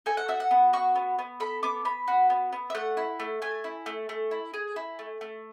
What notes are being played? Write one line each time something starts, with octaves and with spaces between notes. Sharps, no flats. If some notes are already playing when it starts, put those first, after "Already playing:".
A4 G#5
F#5
F#4 E5
F#5
B3
F#4 C#6
B3
B3
A4 B5
B3 D6
B3 B5
F#4
B3
B3
E5
A3 F#5
E4
A3
A3 G#5
E4
A3
A3
E4
G#4
E4
A3
A3